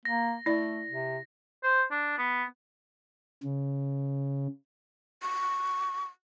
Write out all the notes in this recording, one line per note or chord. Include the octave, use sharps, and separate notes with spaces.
A#3 A#6
A3 E4 D5 A#6
C3
C5
D4
B3
C#3
C#6